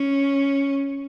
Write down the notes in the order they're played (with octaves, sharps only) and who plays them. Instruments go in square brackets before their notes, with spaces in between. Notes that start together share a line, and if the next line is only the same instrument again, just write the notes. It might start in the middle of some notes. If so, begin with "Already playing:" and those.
Already playing: [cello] C#4